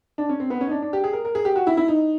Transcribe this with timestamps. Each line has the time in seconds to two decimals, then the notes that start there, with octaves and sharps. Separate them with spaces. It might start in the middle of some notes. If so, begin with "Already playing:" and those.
0.18 D4
0.29 C#4
0.40 C4
0.50 B3
0.61 C#4
0.67 D#4
0.71 D4
0.82 D4
0.93 G4
1.04 G#4
1.13 A#4
1.25 A#4
1.35 G#4
1.45 G4
1.56 F#4
1.67 E4
1.77 E4
1.88 D#4